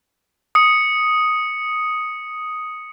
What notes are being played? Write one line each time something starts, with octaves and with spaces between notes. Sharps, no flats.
D#6 C#7